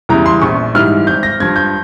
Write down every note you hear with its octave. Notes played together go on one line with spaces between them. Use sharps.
E2 C#3 E3 G3 A#5
C6
A#1 C#6
G#2 E3 G3 F6
G#1 G6
A#6
G2 F3 G#6
G6